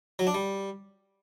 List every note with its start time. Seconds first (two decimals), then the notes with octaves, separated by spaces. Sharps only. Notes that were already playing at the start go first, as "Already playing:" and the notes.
0.19 F#3
0.27 D4
0.34 G3